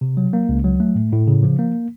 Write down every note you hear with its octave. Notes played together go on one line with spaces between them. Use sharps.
C3
F#3
A#3
C#2
F#3
A3
A2
A2
C#3
F3
A#3